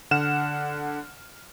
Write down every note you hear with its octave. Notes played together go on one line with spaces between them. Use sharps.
D3 F#5 F6 E7